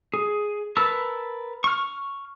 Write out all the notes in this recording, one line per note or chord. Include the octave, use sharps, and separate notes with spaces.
G#4
A#4 B4 A5 E6
C#6 F6